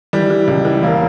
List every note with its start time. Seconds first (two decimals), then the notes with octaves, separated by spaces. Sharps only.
0.13 E3 G3
0.30 E3
0.48 C#2
0.65 E3
0.83 E1 A#3